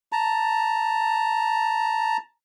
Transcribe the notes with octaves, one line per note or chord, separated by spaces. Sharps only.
A5 A#5